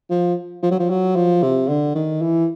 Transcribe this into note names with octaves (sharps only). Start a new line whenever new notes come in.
F3
F3
F#3
F3
F#3
F3
C3
D3
D#3
E3